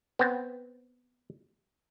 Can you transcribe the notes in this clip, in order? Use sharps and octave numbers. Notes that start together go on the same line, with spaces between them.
B3 C4